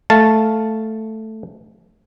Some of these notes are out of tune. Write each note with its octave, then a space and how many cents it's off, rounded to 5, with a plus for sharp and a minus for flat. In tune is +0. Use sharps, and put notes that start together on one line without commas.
A3 +0 F5 +0 A5 +0